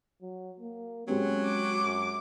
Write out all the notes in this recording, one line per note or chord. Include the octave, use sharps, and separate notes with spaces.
F#3
A#3
F#3 G#3 C4 C#4 G4
D6
F#2